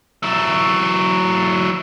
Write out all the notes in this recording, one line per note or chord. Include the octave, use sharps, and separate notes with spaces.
F#3 E4